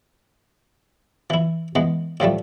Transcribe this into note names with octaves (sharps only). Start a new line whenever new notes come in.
E3 E4
E3 G#3 B3
A2 F3 G3 A3